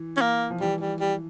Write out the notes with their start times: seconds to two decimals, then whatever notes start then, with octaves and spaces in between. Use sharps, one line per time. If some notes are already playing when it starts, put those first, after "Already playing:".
Already playing: E3
0.17 C#4
0.21 A#3
0.50 F3
0.60 E3 G3
0.81 G3
1.00 G3